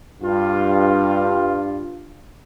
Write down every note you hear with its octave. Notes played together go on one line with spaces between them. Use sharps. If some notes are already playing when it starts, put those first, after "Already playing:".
G2 F4